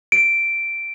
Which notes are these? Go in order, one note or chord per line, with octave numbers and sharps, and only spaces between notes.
D7